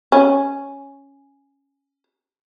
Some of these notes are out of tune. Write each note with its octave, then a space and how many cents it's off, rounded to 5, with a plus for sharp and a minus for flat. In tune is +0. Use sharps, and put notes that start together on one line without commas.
C#4 +0